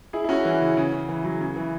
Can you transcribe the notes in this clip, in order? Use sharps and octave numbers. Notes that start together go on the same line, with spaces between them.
E4 G#4
E4
C#4 F#4
E3
C#3
C#3
C#3
E3
C#3 F#3
C#3
E3